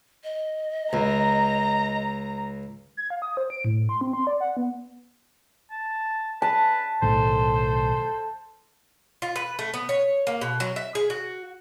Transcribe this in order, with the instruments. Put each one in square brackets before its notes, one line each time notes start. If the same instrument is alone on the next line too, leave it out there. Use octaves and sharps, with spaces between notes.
[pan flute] D#5
[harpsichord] C#2 [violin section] A#5
[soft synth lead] G#6
F5
D#6
C5
D7
A2
C6
C4
C6
D5
F#5
B3
[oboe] A5
[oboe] B4 [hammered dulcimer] A5
[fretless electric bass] B1 A2 D#3 [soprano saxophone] A4 [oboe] C5
[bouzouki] F4
B4
A3
B3
C#5
A#3
B2
F#3
E5
G#4
F#4